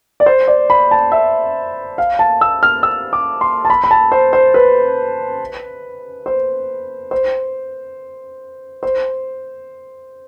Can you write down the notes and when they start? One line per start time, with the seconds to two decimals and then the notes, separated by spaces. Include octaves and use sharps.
0.20 D5
0.26 C5
0.47 D5
0.70 B5
0.91 A5
1.12 E5
1.98 F5
2.19 A5
2.41 E6
2.63 F6
2.83 E6
3.13 D6
3.41 C6
3.65 A5
3.70 B5
3.84 B5
3.91 A5
4.12 C5
4.33 C5
4.54 B4
6.26 C5
7.11 C5
8.83 C5